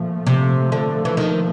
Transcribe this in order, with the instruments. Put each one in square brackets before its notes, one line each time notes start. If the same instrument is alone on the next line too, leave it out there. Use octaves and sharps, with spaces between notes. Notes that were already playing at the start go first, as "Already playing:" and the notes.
Already playing: [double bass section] A#2 F3 A3
[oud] C3
D3
E3
D#3